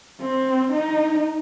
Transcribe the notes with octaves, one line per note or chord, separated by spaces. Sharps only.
C4
D#4